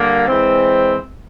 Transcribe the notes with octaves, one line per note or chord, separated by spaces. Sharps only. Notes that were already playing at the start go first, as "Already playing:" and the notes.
Already playing: D3 G3 A#3
E3 G#3 C4